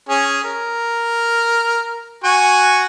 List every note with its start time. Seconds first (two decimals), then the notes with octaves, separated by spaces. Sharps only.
0.09 C#4 G#4
0.44 A#4
2.24 F#4 G#5 C#6